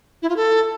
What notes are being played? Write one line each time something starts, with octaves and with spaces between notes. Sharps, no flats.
E4
F4
A4